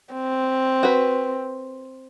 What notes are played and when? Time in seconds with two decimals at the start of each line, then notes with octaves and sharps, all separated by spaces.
0.13 C4
0.83 F#4 B4